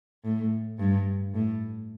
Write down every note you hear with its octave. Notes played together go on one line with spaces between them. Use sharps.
A2
G2
A2